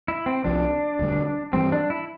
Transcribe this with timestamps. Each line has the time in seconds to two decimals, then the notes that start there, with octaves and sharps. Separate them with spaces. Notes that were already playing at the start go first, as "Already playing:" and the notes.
0.08 E4
0.26 C4
0.44 C2 C3 F3 D4
0.99 E1 D2 D3 G3
1.53 G2 E3 G3 C4
1.72 D4
1.90 E4